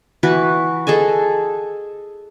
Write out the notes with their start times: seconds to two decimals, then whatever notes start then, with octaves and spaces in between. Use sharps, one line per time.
0.23 E3 F#4 B4
0.87 G#4 A4 D#5 G#5